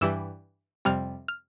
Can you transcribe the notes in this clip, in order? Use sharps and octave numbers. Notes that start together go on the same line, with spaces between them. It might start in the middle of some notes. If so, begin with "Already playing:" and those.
G2 E3 G3 E6
F2 C3 G3 F6
F6